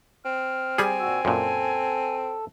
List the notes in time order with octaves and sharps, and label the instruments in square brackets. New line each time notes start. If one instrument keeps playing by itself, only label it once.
[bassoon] C4 [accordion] F6
[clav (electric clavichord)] G3 G#4 [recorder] G#5
[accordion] A#2 F#4 E6
[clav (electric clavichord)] F#2 A#2 [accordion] A4